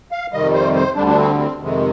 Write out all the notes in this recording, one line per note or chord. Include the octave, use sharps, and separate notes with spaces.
F5
F2 C3 D#3 G3 D#5
C5
C5
D2 D3 G3 D4
D4
C4
C4
F2 C3 D#3 G#3